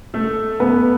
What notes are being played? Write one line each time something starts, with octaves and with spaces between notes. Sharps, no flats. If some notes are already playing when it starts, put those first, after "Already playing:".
A3 A4
B3 B4